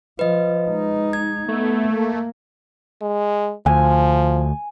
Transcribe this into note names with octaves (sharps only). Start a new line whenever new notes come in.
F3 B4 D#5
G#3 D#4
G#6
A3 B3
A#3
G#3
D2 F3 G#5